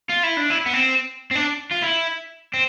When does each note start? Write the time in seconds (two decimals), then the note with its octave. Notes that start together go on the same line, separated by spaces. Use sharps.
0.09 F4
0.23 E4
0.37 D4
0.50 E4
0.66 B3
0.73 C4
1.31 C4
1.36 D4
1.72 F4
1.83 E4
2.54 C4